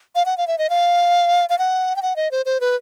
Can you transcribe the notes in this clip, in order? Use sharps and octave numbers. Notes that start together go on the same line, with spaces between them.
F5
F#5
F5
E5
D#5
F5
F5
F#5
G5
F#5
D#5
C5
C5
B4